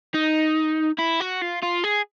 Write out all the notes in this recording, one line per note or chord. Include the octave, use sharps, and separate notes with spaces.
D#4
E4
F#4
F4
F4
G#4